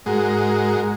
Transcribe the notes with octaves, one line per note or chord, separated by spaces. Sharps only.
G#2 G#3 F#4 A#4